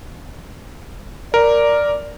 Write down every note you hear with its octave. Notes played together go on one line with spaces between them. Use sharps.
A#4 D5